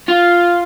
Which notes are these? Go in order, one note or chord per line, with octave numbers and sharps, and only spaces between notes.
F4